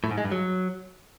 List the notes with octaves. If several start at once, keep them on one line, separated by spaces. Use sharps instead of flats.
A2
G#2
G#3
G2
F#3